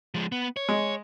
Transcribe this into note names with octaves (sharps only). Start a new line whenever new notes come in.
F3 G#3
B3
C#5
G#3